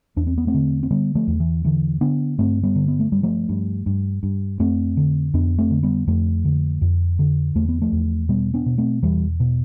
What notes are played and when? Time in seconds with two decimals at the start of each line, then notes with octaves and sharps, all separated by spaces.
0.16 E2 D4
0.27 C4
0.38 B3
0.47 A3 C4
0.54 D3
0.83 C4
0.91 D3 G3 B3
1.15 F3 A3
1.27 E2
1.40 E3
1.64 D3 E3
2.01 D3 B3 D4
2.38 G2 A3 C4
2.63 G3 B3
2.76 D3
2.88 B3
3.00 A3
3.12 G2 G3
3.23 F3 A3
3.49 G2
3.86 G2
4.23 G2
4.59 F2 A3 C4
4.97 D3
5.34 F2 B3 D4
5.58 A3 C4
5.71 D3
5.83 G3 B3
6.07 F2 F3 A3
6.45 D3
6.82 F2
7.19 D3
7.55 E2 A3
7.69 B3
7.82 F3 A3
7.92 E2
8.29 B2 G3 B3
8.54 B3 D4
8.66 B2
8.78 A3 C4
9.03 E2 E3 G3
9.40 B2